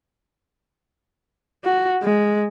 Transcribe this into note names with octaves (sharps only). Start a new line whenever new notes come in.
F#4
G#3